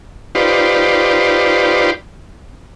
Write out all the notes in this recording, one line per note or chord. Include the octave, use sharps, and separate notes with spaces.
D#4 F4 G4 B4 C5 D5